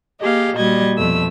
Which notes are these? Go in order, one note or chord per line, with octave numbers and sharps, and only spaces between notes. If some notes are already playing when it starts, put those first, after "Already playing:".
A#3 G4 G#4 D#5 F5
A#2 G3 F#4 D#5 G#6
F2 B2 A3 E6